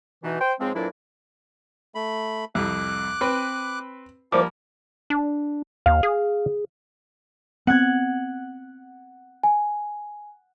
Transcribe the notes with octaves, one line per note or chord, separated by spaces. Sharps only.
B2 E3 D#4
C5 G5
G#2 C#3 F3 G#3 C4
F2 A#2 E3 F#3 D4 E4
A3 B5
C2 F2 D6 F#6
C4 B4
F3 G3 A#3 E4 C5 D5 D6
D4
D#2 F5
G#4
B3 C4 F#5 F#6 G#6
G#5